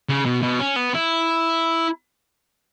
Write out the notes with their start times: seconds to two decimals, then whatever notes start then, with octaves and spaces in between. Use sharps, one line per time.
0.09 C#3
0.25 B2
0.42 B2
0.59 C#4
0.76 B3
0.94 E4